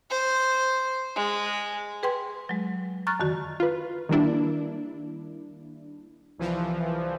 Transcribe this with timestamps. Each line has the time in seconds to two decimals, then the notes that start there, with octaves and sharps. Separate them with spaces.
0.10 C5
1.16 G#3
2.03 G#4 B4 G5 C6
2.49 F#3 G#3
3.07 A#5 C#6 F6 F#6 A6
3.20 F2 D3 D#3 F#4
3.60 F4 B4
4.09 D#3 G3 A#3 D4 E4
6.38 C2 E3 F3